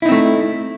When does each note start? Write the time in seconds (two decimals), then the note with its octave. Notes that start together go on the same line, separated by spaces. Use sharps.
0.02 E4
0.05 D#4
0.09 C4
0.12 A3